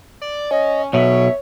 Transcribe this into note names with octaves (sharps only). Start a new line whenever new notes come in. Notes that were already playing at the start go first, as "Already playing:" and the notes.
D5
C#4 D#5
B1 B2 C#5 E5